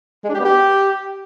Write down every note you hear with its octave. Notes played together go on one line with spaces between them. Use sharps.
G#3
D4
G4
B3
G4